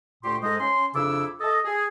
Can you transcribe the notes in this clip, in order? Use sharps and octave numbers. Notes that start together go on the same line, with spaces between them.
D2 A#2 A3 G4 C6
G#2 G#3 A4 C5 D#5
C#4 C6
F2 C#3 D4 E4 D6 E6
A4 D#5
G#4